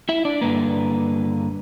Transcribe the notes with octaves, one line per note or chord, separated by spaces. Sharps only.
E4 E5
D4 D5
G2 D3 A#3 B4